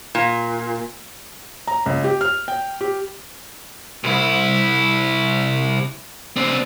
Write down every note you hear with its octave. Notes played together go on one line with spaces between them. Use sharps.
A#2
A#5
C#2
G4
F6
G5
G4
C2 E4
C4 D4